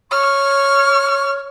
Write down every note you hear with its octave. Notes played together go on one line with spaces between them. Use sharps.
C#5 C#6 F6